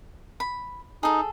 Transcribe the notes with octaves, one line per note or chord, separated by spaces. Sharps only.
B5
D#4 G#4 A4